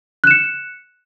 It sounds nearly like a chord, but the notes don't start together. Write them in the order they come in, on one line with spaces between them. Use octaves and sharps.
F#6 E7 C#7